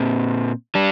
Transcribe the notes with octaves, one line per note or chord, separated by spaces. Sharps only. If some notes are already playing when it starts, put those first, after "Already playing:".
Already playing: A#2 C4
G3 D4